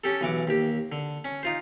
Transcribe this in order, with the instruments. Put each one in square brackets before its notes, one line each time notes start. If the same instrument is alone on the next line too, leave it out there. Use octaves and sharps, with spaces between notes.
[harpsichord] C#4 G4 A4
B1 E3 F#4 D6
D#2 G4
D3
C#4
D#4 F4 C5